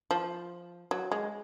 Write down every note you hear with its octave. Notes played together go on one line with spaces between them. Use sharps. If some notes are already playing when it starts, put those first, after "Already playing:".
F3
F#3
G#3